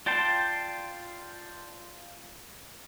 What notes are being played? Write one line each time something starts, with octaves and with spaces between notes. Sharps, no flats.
F4 D5 G5 A5 C6